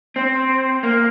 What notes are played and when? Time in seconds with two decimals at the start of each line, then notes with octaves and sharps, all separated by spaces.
0.16 C4
0.83 A#3